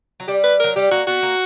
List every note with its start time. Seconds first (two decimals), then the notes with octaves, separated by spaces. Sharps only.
0.20 F#3
0.28 G3 G4
0.44 B4
0.60 F#3 A#4
0.76 G3 G4
0.91 A#3 F#4
1.08 B3 F#4
1.23 A#3